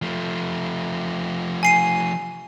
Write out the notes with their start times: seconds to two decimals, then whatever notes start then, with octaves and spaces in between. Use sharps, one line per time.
0.02 F3 A3
1.63 G#5 C7 D#7